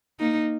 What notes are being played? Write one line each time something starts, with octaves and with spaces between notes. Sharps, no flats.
A#3 D#4